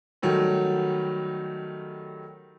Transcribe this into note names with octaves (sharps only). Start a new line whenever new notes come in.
D#3 F#3 G3 A3